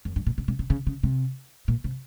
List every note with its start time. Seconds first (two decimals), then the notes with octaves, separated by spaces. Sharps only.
0.05 F2
0.16 G2
0.27 A#2
0.38 C3
0.48 C3
0.59 C3
0.70 C#3
0.87 C#3
1.03 C3
1.68 A#2
1.84 C3